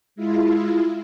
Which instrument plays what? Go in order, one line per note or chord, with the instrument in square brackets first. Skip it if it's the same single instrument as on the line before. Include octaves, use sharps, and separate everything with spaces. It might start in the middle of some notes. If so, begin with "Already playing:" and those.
[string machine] G#3 E4 F4